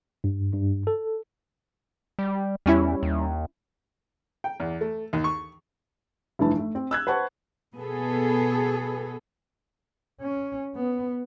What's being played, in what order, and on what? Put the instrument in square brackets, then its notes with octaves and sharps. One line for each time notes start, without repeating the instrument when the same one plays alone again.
[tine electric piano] G2
G2
A4
[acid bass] G3
[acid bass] E2 [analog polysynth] G3 C#4 E4
[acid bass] D#2
[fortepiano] G5
E2
A3
D#2
C#6
[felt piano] F1 G2 E3 A5
A3
C4
E6 F#6 G#6
B4 C5 F#5 A5 C#6
[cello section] B2 B3 G#4 A4
[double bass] C#4
B3